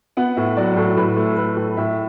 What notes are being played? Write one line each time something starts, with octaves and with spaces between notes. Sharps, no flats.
B3 F#5
A2 E5
F#3 D5
A2 A4
A2 B4
A3
A3 B4
A2
A2 E5